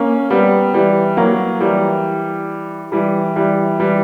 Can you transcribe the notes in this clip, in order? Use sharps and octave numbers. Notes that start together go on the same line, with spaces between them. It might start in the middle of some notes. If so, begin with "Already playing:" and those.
Already playing: A#3 C#4
G3 B3
E3 G3
F#3 A#3
E3 G3
E3 G3
E3 G3
E3 G3